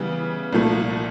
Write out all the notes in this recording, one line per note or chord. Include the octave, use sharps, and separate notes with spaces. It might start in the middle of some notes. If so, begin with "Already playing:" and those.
Already playing: C#3 E3 G3 B3
C2 A#2 F3 A3